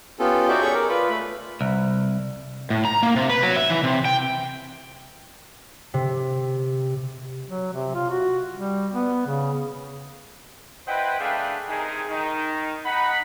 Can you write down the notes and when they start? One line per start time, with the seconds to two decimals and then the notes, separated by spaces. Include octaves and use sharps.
0.19 B3 C#4 F4 G4 A4
0.48 D#4 F#4 A4 C5 D5 E5
0.60 G#4 A4 C#5 C#6
0.74 A#4 D5
0.89 F4 B4 B5
1.09 A3 B5
1.61 C2
2.70 A2
2.85 A#5
3.03 A#3
3.16 C3
3.29 B4
3.43 F#3
3.56 E5
3.70 E3
3.84 C3
4.05 G5
5.94 C3
7.47 F#3
7.73 C3
7.95 F4
8.10 F#4
8.55 G3
8.93 B3
9.27 C#3
10.87 E4 B4 C5 D#5 F#5 G5
11.20 A3 D4 G#4 B4 F5 G5
11.69 C3 D#3 D#4 G#4
12.09 D#3 D#4
12.86 D#4 F#5 B5